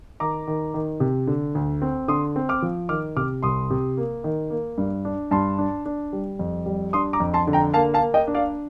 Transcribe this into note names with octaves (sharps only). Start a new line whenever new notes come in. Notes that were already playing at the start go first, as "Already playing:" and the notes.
D#3 A#5 D6
D#3
D#3
C3
D3
D2
C4
D3 C6 D#6
C4
D6 F6
F3
D#3 D6 F6
C3 D6 F6
C2 C6 D#6
C3
A#3
D#3
A#3
G2
D4
G2 A5 C6
D4
D4
G3
F2
G3
D4 C6 D#6
A#5 D6
F2
A5 C6
D3
G5 A#5
A#3 F5 A5
F5 A5
A#3
D#5 G5
D4
D5 F5